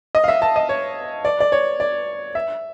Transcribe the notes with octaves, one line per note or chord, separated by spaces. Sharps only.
D#5
F5
E5
A5
D#5
C#5
D5
D5
C#5
D5
E5